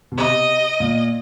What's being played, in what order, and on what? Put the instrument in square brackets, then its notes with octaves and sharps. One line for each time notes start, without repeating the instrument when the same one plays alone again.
[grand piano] B2
[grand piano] C3 [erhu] D#5
[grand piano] A#2